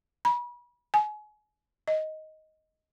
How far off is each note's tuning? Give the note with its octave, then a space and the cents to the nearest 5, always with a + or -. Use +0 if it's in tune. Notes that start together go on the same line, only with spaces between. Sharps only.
B5 -35
G#5 +30
D#5 +10